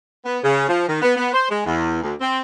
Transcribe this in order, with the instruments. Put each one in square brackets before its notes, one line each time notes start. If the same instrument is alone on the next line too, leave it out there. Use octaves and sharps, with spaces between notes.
[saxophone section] B3
C#3
F3
D#3
B3
B3
C5
G#3
E2
D2
C4